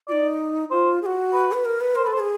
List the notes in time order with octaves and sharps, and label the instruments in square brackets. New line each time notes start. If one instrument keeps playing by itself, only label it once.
[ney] D#4 F4 [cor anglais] D5
[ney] F4 [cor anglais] C5
[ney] G#4
F#4
[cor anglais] B4
[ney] B4
A#4
B4
[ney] A#4 [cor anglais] C5
[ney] A4 [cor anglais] B4
[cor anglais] C5
[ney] A4
G#4